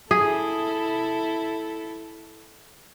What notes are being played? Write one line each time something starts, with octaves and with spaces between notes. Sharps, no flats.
E4 G#4 A4